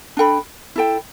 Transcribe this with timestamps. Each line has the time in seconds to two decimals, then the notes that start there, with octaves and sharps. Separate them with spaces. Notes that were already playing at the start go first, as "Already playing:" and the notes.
0.17 D4 A4 G5 B5
0.76 E4 A4 G5